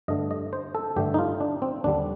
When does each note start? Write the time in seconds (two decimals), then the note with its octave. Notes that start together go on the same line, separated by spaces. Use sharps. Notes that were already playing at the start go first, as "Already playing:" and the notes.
0.08 G2 D3 A3 D#5
0.31 D#5
0.53 C5
0.75 A4
0.96 G2 D3 A3 G4
1.14 D#4
1.18 F4
1.41 D4
1.62 C4
1.84 D#2 D3 G3 D4